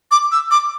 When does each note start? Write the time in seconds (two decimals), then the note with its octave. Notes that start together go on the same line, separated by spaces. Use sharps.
0.11 D6
0.32 E6
0.51 D6